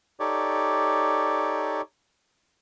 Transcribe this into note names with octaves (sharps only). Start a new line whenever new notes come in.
D#4 G4 A4 C#5 D5